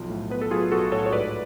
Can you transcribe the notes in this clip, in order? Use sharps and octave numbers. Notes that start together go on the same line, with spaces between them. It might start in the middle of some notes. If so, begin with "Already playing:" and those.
Already playing: B1 F3 F4
A2
B3 B4
A4
F#3 F4 G#4
B1 F#4 A4
A2 A4 C#5
C#5
G#2 B4 D5